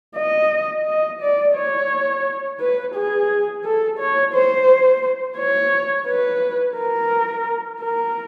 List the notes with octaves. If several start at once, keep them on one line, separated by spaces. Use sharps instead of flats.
D#5
D#5
D5
C#5
B4
G#4
A4
C#5
C5
C#5
B4
A#4
A#4